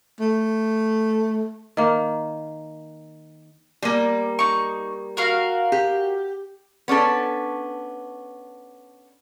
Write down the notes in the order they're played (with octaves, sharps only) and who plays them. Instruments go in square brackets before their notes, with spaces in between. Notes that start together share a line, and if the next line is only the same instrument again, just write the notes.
[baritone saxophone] A3
[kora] D#3 A#3
[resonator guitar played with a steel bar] G3 A#3
[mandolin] D#4 C#6
F#4 A#4 F5
[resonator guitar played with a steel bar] G4
B3 C#4 D4 A4